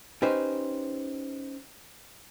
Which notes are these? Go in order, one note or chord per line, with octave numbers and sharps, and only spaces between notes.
C#4 D#4 G4 B4 C5